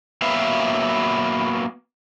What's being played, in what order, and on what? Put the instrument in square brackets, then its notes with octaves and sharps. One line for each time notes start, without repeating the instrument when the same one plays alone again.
[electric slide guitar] F#3 A#3 B3 B4 E5 F5